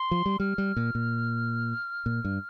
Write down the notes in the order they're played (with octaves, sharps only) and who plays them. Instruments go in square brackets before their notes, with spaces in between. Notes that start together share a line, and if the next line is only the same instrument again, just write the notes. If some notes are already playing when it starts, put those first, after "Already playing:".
Already playing: [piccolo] C6
[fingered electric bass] F3
G3
[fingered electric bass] G3 [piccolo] F6
[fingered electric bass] G3
A#2
A#2
A#2
G2